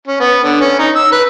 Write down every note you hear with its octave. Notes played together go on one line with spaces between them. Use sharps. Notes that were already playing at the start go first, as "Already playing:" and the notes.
C#4
B3
D3
C#4
D#4
E6
B4